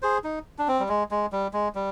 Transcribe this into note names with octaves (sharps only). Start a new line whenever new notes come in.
G#4 C5
D#4
D4
C4
G3
G#3
G#3
G3
G#3
G3